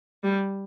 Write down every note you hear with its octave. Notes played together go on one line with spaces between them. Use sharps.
G3